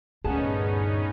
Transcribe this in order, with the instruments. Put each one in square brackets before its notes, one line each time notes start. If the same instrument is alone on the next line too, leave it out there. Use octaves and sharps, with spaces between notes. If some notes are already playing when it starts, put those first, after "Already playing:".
[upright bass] D2 G2 [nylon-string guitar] A#2 G#4 A5 [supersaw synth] B3 C#4 D#4